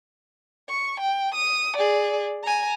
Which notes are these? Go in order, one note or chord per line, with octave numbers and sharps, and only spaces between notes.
C#6
G5
D#6
G#4 D5
G#5 A#5